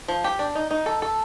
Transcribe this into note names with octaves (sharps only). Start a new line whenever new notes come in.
F3
G4
D4
D#4
D#4
A4
A4